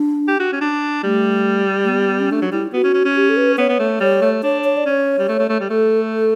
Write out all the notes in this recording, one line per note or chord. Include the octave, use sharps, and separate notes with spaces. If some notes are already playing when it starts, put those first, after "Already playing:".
Already playing: D4
G4
F#4
C#4
D4
G3 A3
A3
B3
C#4
A3 D4
F#3
G3 E4
B3 F#4
C#4
C#4
C#4
G4
A4
B4
B3 C#5
B3
A3
G3 C#5
A3
D4 C#5
C#5
D5
C#4 C#5
G3
A3
A3
A3
G3
A3 A4
A4